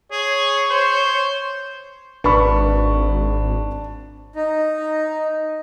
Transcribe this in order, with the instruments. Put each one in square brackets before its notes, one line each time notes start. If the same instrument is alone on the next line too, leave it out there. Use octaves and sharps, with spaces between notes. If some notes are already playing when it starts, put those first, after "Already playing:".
[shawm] G#4 [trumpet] C#5
[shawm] C5
[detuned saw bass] G#1 [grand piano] D4 [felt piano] B4 B5 C#6
[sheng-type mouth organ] D#4